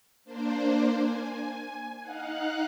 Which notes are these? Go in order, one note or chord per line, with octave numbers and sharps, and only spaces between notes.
A#3 D4 C5
G#5
D#4 F5 F#5 F#6